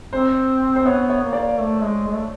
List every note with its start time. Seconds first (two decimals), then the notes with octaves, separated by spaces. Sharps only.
0.12 C4 C5
0.76 C5
0.85 B3 C#5
1.10 C#5
1.22 A#3
1.33 D5
1.57 A3
1.82 G#3
2.06 G#3
2.14 A3